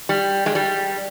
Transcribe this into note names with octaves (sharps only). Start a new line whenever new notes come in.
G3
G#3
G3